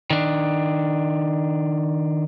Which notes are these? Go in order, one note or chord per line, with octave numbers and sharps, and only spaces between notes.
D#3 D4